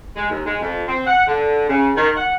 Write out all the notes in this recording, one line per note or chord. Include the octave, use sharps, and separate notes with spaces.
G#3
D#2
G#3
F2
C4
F#5
D3
C#3
D#3
F#5